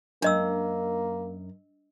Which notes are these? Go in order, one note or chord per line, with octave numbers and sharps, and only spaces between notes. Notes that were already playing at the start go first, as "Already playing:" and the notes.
F#2 A#3 D4 D#5 E6